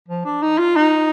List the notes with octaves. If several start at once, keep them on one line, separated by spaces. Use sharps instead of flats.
F3
D4
D#4
F4
D#4